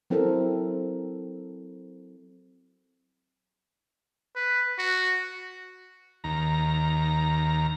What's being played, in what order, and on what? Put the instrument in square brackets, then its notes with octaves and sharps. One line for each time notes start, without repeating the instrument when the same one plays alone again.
[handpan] F#3 C4 E4 A4 A#4
[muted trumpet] B4
F#4
[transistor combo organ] D#2 A#5